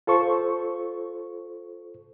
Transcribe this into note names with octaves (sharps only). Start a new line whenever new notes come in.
F4 A4 C5 C#6